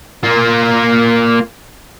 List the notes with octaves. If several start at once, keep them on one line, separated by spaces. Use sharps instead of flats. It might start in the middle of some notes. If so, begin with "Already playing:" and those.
A#3 F4